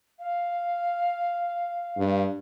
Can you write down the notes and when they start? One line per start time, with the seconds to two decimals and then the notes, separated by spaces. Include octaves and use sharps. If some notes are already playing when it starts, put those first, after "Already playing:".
0.19 F5
1.98 G2